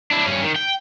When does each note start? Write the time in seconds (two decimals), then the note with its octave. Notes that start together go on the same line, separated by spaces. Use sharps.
0.11 D4 E4
0.26 G2 C#4
0.43 D#3
0.56 G5